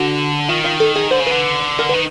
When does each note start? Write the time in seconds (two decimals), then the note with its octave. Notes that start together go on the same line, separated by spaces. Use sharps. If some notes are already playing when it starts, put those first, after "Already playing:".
Already playing: D3 F#4
0.49 D#3 F4
0.64 F4
0.80 A4
0.95 G#4
1.11 D3 C5
1.20 C#3
1.27 D3 B4
1.79 A#4
1.89 B4
1.94 D#3